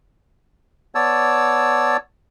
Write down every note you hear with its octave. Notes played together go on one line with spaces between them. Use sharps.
B3 C#5 D5 A5 E6